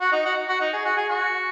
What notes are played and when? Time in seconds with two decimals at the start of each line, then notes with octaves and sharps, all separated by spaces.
0.01 F#4
0.12 D#4
0.25 F#4
0.49 F#4
0.61 D#4
0.73 G#4
0.85 F#4
0.97 G#4
1.10 F#4